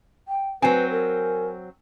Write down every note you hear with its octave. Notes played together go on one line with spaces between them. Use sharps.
G5
F#3 C4 B4 G#5
A#4